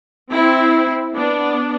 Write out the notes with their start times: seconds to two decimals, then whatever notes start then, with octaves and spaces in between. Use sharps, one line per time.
0.32 C4 E4
1.15 B3 D4